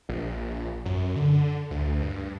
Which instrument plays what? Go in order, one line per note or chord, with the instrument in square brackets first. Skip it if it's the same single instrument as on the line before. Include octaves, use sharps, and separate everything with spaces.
[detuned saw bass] A#1
F#2
D3
D2
G2